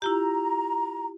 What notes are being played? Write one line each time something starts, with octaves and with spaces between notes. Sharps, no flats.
E4 F4 G4 A#5